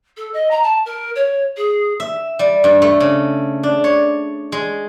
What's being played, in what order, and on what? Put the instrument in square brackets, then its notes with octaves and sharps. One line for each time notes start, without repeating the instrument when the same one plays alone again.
[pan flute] A4
D#5
A#5
A5
A#4
C#5
G#4
[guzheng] E5
G3
G2
A3
C#3
D4
C#5
G#3